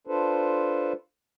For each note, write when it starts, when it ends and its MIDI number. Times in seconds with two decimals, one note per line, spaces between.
0.07 0.93 62
0.07 0.93 65
0.07 0.93 69
0.07 0.93 71
0.07 0.93 72